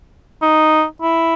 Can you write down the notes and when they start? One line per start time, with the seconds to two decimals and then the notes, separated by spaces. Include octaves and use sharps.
0.42 D#4
1.02 E4